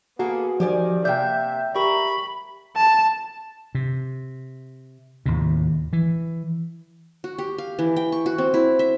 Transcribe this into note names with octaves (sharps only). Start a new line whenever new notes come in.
A#3 B3 F#4 G#4 A4
D#3 F3 G4 D5 G#5
C3 A#3 D5 E5 G5 G6
G4 A#4 E5 B5 C#6
A5
C3
D#2 A2 C3
E3
F#4
G4
F5
E3
G5
C#6
F#4
C4
E4
E5